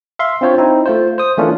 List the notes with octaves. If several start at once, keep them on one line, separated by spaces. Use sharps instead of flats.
E5 F5 C6
C4 D4 F4 C5 C#5
C4 D#4 E4
A3 F4 C5
C5 D#6
E3 A3 A#3 C#4 D4 F4